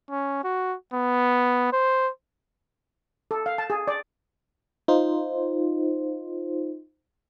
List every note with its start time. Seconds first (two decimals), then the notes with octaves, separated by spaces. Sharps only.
0.10 C#4
0.44 F#4
0.94 B3
1.73 C5
3.31 A4
3.46 F5
3.58 A5
3.70 G#4
3.88 D5
4.88 D#4 F4 C5